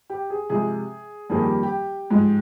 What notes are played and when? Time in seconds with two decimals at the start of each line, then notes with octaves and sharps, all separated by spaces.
0.10 G4
0.30 G#4
0.50 C3 F3 G#3 G#4
1.30 F2 D#3 G3 A#3 G#4
1.41 G4
1.63 G4
2.10 G#2 F3 G#3